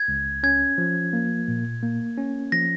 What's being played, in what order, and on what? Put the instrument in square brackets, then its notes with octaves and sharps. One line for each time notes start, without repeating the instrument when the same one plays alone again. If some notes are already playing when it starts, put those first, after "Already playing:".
Already playing: [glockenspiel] G#6
[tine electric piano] C#2
[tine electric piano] C#4 [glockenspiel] G#6
[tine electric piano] F3
A#3
A#2
A#3
C#4
[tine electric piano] F3 [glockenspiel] A#6